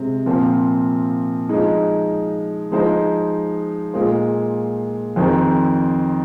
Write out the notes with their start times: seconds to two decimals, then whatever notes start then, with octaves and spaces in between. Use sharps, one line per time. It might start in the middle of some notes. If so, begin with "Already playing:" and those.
Already playing: C3 G#3 C4
0.26 A#2 F3 C4
1.49 F3 G#3 D#4
2.72 F3 G#3 D#4 C5
3.94 A#2 G#3 F4 C5
5.16 F2 D#3 C4 G#4 C5